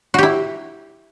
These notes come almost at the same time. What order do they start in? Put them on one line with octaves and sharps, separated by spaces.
F#4 G4 E4